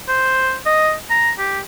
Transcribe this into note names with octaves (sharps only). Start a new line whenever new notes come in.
C5
D#5
A#5
G4